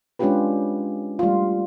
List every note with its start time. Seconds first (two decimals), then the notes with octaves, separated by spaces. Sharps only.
0.19 G#3 C#4 D4 F4 G4 B4
1.19 G3 A3 F4